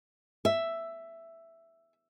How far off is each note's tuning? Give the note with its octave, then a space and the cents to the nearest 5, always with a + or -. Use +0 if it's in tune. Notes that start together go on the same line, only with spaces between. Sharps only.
E5 +5